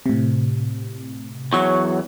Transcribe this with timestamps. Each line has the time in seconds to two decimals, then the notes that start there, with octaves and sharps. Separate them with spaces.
0.06 A2 C3
1.53 E2 F#3 C#5 C#6